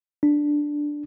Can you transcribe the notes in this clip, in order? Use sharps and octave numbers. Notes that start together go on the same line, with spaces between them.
D4